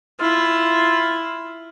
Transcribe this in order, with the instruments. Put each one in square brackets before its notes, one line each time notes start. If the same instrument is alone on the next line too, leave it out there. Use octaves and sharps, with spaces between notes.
[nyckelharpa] E4 [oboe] F4